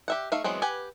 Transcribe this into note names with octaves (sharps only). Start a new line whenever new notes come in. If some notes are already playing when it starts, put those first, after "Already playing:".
G4 E5 F#5
A3 D#4 E5 F5
E3 F#3 G#3 B3 C4
G4 B4 F#5 G#5